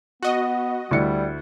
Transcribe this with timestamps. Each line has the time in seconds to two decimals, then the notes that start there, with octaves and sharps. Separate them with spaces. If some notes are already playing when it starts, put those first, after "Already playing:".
0.23 B3 F#4 D#5
0.91 D2 G3 E4 C#7